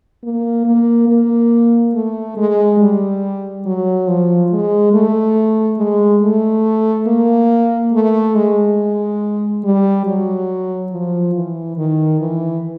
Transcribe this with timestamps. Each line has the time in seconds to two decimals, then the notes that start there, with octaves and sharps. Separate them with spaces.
0.23 A#3
0.66 A#3
1.08 A#3
1.94 A3
2.37 G#3
2.80 G3
3.65 F#3
4.07 F3
4.51 G#3
4.93 A3
5.78 G#3
6.22 A3
7.07 A#3
7.93 A3
8.35 G#3
9.64 G3
10.06 F#3
10.91 F3
11.34 E3
11.77 D#3
12.20 E3